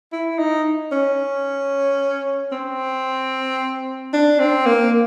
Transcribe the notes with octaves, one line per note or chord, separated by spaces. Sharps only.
E4
D#4
C#4
C4
D4
C4
A#3